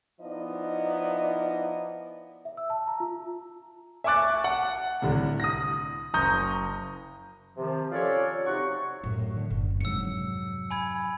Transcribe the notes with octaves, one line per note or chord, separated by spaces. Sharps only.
F3 B3 D#4 E4 D5 D#5
E5
E6
A5
A#5
F4
E5 G#5 C#6 D6 F#6 A6
F#5
C2 A2 D3
D#6 A#6
F#1 A#5 C#6 D#6 G6
C3 D#3 F3
C#4 F4 G4 A4 C#5 D5
C3 F#3 D#4 G4 F#5 C#6
F#2 A2
D3
F#1
F2 G#2 C3 F#3 E6 C#7
G#5 B5 G#6